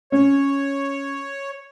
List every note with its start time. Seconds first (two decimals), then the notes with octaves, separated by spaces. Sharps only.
0.12 C#4 C#5